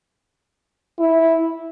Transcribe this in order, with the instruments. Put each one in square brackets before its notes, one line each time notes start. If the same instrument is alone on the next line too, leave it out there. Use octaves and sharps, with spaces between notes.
[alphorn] E4